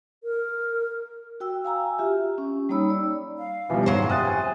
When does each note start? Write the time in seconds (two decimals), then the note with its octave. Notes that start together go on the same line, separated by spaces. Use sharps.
0.24 A#4
1.40 F#4 G5 E6
1.65 F5 G#5 A#5 E6
1.99 F4 G4 E5
2.38 C#4
2.69 G3 A#3 D#4 C#5 B5 E6
2.90 D5
3.38 F5
3.70 B2 E3 F3 G3
3.86 G#1 C#3 F#3 C5
4.09 C3 G#5 D#6 F#6 A6